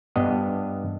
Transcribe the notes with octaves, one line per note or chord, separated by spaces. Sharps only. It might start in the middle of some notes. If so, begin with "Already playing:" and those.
G2 B3 D4 D#5